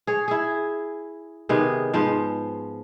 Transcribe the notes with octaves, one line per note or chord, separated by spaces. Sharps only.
G#4 C#5
E4 G#4
C3 D#3 B3 G#4
G#2 F3 B3 C5